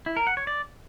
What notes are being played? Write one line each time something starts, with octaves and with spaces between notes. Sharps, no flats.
E4
A#4
F#5
C#5
D5